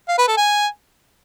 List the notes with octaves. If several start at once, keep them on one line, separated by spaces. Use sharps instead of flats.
F5
B4
A4
G#5